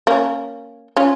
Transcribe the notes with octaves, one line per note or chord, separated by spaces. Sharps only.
A#3 C#4
C#4 F4